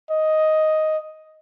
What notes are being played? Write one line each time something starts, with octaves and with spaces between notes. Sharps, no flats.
D#5